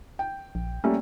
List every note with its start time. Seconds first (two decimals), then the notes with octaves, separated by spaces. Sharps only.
0.19 G5
0.55 A#1
0.84 G3 A3 A#3 C#4